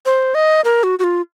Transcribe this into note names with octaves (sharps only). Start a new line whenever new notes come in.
C5
D#5
A#4
F#4
F#4
F4